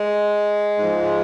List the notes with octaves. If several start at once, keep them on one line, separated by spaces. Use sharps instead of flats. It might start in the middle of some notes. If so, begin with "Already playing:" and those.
Already playing: G#3
G#2 F3